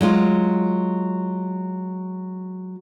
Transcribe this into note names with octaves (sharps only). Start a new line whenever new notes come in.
F#3 G#3 F4